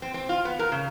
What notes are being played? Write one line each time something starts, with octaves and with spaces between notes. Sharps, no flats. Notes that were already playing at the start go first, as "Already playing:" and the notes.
C4
C4
F4
B3
A#4
C#3